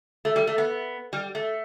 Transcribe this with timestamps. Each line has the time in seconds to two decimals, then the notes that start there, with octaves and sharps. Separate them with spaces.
0.25 A3
0.36 G3
0.47 A3
0.58 B3
1.13 G3
1.35 A3